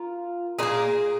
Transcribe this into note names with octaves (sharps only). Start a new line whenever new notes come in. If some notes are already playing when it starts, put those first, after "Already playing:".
Already playing: F4 A#4
A#2 A#3 D#4 G#4